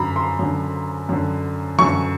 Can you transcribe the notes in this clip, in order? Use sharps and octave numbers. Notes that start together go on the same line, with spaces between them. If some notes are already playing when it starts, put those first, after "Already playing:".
Already playing: F#2 D3 A#5 B5
C6
F#2 D3
F#2 D3
F#2 D3 C#6